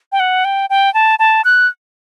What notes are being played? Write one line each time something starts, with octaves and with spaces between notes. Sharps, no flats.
G5
F#5
G5
G5
A5
A5
F#6